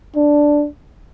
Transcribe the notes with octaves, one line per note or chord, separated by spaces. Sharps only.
D4